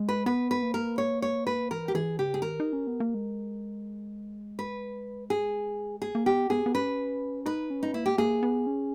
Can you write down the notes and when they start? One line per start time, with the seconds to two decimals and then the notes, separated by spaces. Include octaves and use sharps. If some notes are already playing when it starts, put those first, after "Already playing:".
Already playing: G#3
0.09 B4
0.26 B3 B4
0.51 B4
0.62 A#3
0.74 A#4
0.98 C#5
1.22 C#5
1.47 B4
1.71 E3 A#4
1.88 G4
1.95 E3 G#4
2.18 C#3 G4
2.34 G#4
2.42 D#3 A#4
2.60 D#4
2.73 C#4
2.87 B3
3.00 A#3
3.14 G#3
4.59 B4
5.30 G#4
6.02 A#3 G#4
6.15 A#3
6.26 B3 G4
6.50 B3 G#4
6.66 B3
6.74 C#4 B4
7.46 D#4 B4
7.70 C#4
7.83 D#4
7.94 A#3 E4
8.06 G4
8.18 A#3 G#4
8.43 B3
8.67 C#4